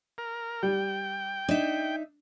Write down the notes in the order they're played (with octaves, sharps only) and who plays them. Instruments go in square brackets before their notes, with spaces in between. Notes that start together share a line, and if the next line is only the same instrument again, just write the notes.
[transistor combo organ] A#4
[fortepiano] G3 [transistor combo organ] G5
[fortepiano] D4 [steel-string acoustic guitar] D#4 E5